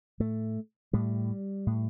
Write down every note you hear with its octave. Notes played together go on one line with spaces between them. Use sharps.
A2 A3
A2 G3
A2